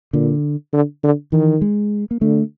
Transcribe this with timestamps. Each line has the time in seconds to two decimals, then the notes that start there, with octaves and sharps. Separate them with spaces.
0.13 A#2 D3
0.73 D3
1.03 D3
1.32 D#3 E3
1.61 G#3
2.11 A#3
2.21 D3 A3